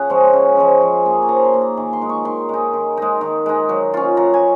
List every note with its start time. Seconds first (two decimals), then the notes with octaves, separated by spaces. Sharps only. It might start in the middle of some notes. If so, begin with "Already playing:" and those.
Already playing: C#3 F#5
0.10 F3 G#3 C#4
0.33 C#3
0.57 F3 G#3 C#4
0.82 F3
1.06 A#3 D#4
1.22 G#5
1.29 F3 A#5
1.45 C6
1.53 A#3 D#4
1.61 A#5
1.77 D#3 G#5
1.93 C6
2.01 G#3 D#4
2.09 C#6
2.25 D#3 C6
2.49 G#3 D#4
2.73 D#3
2.97 G#3 D#4
3.21 D#3
3.46 G#3 D#4
3.69 F#3
3.94 C#4 F4
4.17 F#3 A#5
4.34 G#5